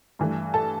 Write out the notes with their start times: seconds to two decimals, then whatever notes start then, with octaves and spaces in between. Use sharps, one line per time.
0.19 G2 E3 A3
0.54 A4 A5